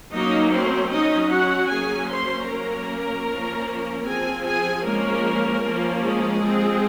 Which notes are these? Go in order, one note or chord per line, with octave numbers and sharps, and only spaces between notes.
F#3 A#3 C#4 D#4 D#5
C4 C5
F#3 C#4 D#4 D#5
F#4 F#5
F#3 A#3 C#4 G#4 G#5
C5 C6
F#3 A#3 C#4 A#4 A#5
F3 A#3 C#4
F3 C4 G#4 G#5
G#4 G#5
F3 G#3 A#3 C#4 A#4
F3 A#3 C#4
G#3 G#4
F3 C4